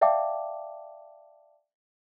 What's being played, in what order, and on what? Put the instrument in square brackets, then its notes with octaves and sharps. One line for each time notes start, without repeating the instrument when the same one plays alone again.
[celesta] D5 E5 F5 G5 A5 D6